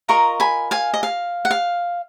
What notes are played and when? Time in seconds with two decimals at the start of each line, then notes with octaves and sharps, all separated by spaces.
0.08 F4 A#4 D#5 A#5 C#6
0.40 G#5 B5
0.71 F5 G#5
0.94 D#5
1.03 F5
1.45 F#5
1.51 F5